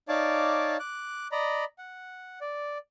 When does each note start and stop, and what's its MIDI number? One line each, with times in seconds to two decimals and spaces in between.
0.08 0.77 63
0.08 0.77 73
0.08 0.77 74
0.08 0.77 77
0.08 0.77 81
0.08 0.77 86
0.80 1.28 86
0.80 1.28 90
1.32 1.65 74
1.32 1.65 75
1.32 1.65 82
1.32 1.65 83
1.78 2.39 78
2.41 2.78 74